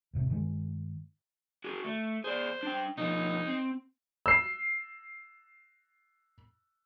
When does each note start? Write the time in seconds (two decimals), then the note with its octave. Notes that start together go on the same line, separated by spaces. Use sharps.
0.13 E1 G#2 C3
0.30 G2 D#3 F3 G#3
1.64 F#4 G#4
1.84 A3
2.24 G#4 C5 D5
2.63 D4 G5
2.97 B2 F3 D#4
3.47 C4
4.26 E6 C7